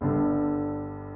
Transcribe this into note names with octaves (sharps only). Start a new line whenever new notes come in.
G1 G2 D3